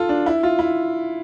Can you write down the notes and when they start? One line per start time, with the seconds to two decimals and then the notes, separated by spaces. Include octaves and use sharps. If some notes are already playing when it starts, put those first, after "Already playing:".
Already playing: F4 A4
0.09 D4
0.26 E4
0.43 F4
0.59 E4